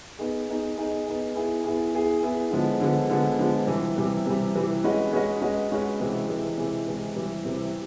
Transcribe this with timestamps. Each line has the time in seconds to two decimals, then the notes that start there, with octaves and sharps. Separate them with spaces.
0.19 B3 D#4 G#4
0.48 B3 D#4 G#4
0.77 B3 D#4 G#4
1.07 B3 D#4 G#4
1.35 B3 E4 G#4
1.64 B3 E4 G#4
1.93 B3 E4 G#4
2.23 B3 E4 G#4
2.51 D3 F3 G#3 B3
2.80 D3 F3 G#3 B3
3.10 D3 F3 G#3 B3
3.39 D3 F3 G#3 B3
3.67 C3 E3 G3
3.97 C3 E3 G3
4.25 C3 E3 G3
4.55 C3 E3 G3
4.84 G#3 C#4 F#4 B4 D#5
5.13 G#3 C#4 F#4 B4 D#5
5.42 G#3 C#4 F#4 B4 D#5
5.71 G#3 C#4 F#4 B4 D#5
6.00 C3 E3 G#3
6.28 C3 E3 G#3
6.57 C3 E3 G#3
6.87 C3 E3 G#3
7.16 C3 E3 G3
7.45 C3 E3 G3